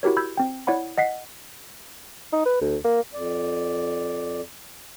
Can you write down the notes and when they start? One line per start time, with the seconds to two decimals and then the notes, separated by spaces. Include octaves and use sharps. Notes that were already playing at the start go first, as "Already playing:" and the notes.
0.03 E4 F#4 G4 A#4 C#5
0.17 B5 E6 G6 G#6
0.37 C4 G5
0.67 E4 C#5 D5 F#5 B5
0.98 D#5 F#5 B6 C7
2.33 D#4
2.46 B4
2.61 D2
2.84 A#3
3.13 F2 D5